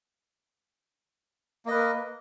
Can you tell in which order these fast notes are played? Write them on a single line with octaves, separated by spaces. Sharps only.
A#3 D#5 B4 A#4